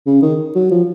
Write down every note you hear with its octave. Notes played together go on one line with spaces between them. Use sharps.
C#3
D#3
F#3
F3